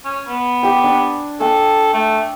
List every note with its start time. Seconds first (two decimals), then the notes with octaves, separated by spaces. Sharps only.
0.05 C#4
0.28 B3
0.63 G4 G5
0.84 D4 G#5
1.40 A4 G5 G#5
1.94 A3